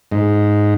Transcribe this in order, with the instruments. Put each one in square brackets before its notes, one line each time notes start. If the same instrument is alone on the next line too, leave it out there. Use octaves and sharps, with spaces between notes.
[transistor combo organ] G#2